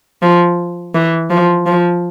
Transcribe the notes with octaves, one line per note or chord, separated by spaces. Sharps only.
F3
E3
F3
F3